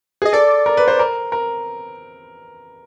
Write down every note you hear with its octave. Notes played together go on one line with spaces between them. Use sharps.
G#4 D#5
A4 D5
A#4
B4
C5
A#4
A#4